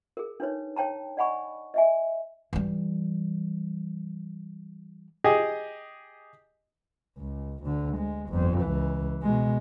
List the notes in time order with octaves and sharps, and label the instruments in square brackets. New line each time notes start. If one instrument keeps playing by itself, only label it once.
[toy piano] G#4 A#4
D4 D#4 B4 C#5
C#5 G5 A5 A#5
D5 D#5 F#5 G#5 B5 C#6
D#5 E5 G#5
[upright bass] E3 G3
[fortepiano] G4 G#4 D#5
[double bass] C#2
D2 D3
G#3
G1 F2
C#2 E3
B2 G#3